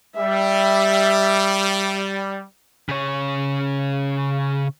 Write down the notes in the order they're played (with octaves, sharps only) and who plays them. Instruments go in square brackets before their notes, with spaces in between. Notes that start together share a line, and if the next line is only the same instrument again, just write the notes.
[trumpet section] G3 [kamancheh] E5
[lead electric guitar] C#3 C#5